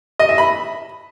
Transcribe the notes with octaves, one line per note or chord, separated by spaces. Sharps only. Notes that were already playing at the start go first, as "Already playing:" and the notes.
D#5
E5
B5